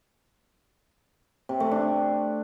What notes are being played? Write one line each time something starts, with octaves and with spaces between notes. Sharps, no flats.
C3
A3
D4